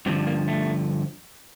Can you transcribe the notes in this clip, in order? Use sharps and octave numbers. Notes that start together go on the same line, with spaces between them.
G2 D3 F3 C4
A#3
A3